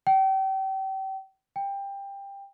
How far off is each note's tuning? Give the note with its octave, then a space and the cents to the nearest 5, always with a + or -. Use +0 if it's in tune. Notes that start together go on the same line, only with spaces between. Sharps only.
G5 -35
G5 +20